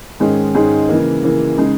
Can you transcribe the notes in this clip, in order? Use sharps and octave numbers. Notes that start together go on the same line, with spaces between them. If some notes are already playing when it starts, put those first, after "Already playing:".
G#2 D#3 G#3 C#4 G#4
G#2 D#3 G#3 C#4 G#4
C#3 E3 A#3
C#3 E3 A#3
C#3 G#3 D#4 G#4